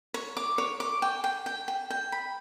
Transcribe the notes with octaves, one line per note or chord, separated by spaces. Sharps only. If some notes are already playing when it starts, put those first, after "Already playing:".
C#5
D6
C#5
D6
G5
G5
G5
G5
G5
B5